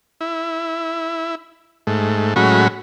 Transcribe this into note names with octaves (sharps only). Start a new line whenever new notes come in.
E4
G#2 A3
A2 F#3 G#3 C#4 F#4 B5